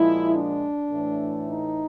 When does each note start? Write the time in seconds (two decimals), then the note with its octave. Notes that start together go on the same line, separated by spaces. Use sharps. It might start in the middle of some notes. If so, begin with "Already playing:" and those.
Already playing: A#2 F3 G#3 E4
0.33 D4
0.90 A2 E3 A3
1.48 D#4